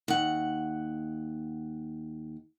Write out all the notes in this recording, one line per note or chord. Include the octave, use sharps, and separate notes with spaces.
D#2 F#5